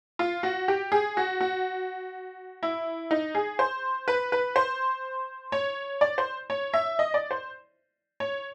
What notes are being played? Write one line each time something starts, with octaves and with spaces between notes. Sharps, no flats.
F4
F#4
G4
G#4
F#4
F#4
E4
D#4
G#4
C5
B4
B4
C5
C#5
D5
C5
C#5
E5
D#5
D5
C5
C#5